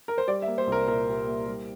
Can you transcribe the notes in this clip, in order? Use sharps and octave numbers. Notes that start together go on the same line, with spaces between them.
A#4
C5
G3 D5
E5
A#3
C5
C2
A#4
A#2 A#4
G3
A#3
G3